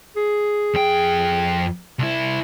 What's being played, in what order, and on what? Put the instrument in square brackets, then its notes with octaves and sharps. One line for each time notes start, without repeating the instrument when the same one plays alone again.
[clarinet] G#4
[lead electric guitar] F2 G5
C2 E4